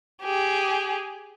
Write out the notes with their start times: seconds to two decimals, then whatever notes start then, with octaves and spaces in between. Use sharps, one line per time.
0.23 G4 G#4